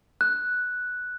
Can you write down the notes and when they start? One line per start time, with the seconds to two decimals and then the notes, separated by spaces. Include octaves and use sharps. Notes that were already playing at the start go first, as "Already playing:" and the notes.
0.21 F#6